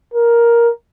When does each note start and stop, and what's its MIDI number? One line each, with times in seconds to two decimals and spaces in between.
0.14 0.70 70